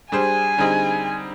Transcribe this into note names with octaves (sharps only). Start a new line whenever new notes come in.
G3 D4 G#4 C5 G#5
D3 G3 C4 D#4 G#4